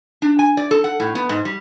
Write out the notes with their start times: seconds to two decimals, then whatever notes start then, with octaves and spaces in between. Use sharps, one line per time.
0.22 D4
0.39 G#5
0.57 D5
0.71 A4
0.84 F#5
1.00 A2
1.15 B3
1.29 G#2
1.45 G3